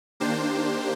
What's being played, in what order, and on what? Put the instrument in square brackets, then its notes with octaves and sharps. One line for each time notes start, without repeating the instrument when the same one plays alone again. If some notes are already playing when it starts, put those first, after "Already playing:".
[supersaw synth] D#3 A#3 D4 G4 C5